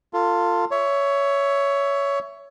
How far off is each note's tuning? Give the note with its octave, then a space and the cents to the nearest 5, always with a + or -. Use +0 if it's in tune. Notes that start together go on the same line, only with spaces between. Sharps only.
F4 +0 A4 +30
C#5 +15 E5 +5